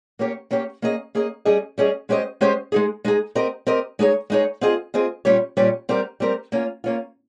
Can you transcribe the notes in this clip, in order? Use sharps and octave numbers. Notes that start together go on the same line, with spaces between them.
A#3 C#4 G4 C#5
A#3 C#4 G4 C#5
A#3 C#4 G#4 D#5
A#3 C#4 G#4 D#5
G3 C#4 G#4 D#5
G3 C#4 G#4 D#5
G#3 C#4 G4 C5 D#5
G#3 C#4 G4 C5 D#5
G#3 D#4 G#4
G#3 D#4 G#4
C4 G4 A#4 D#5
C4 G4 A#4 D#5
G#3 D#4 G#4 C#5
G#3 D#4 G#4 C#5
C4 F4 G#4 D#5
C4 F4 G#4 D#5
A#2 G3 C#4 G4 C#5
A#2 G3 C#4 G4 C#5
G3 C4 G4 A#4
G3 C4 G4 A#4
A#3 C#4 F4
A#3 C#4 F4